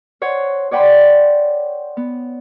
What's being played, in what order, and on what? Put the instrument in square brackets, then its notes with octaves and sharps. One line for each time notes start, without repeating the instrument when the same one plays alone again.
[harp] C5 C#5 F#5
C#5 D5 F#5 G5 B5 C6
B3